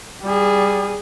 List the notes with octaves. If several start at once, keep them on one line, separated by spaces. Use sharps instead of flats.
G3 G#4